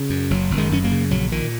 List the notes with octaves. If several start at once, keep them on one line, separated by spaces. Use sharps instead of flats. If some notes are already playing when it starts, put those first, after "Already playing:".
Already playing: C#3
F#2
F#1 F#3
F#1
D#3 G#3
F#2 C#4
F#3 A#3
C#3
A#1 F#3
A#2 D#3